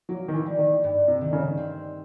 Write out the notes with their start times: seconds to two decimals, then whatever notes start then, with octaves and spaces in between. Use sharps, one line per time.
0.09 F#3 A#3
0.28 D#3
0.34 E3
0.46 G3
0.59 D#3
0.84 G2
1.08 C3
1.21 D#3
1.33 C#3
1.57 C4